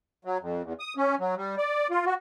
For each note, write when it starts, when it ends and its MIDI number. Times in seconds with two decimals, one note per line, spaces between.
0.25 0.38 54
0.41 0.62 41
0.63 0.73 40
0.80 0.94 87
0.97 1.15 61
1.20 1.35 54
1.37 1.55 55
1.58 1.87 74
1.91 2.05 65
2.06 2.14 66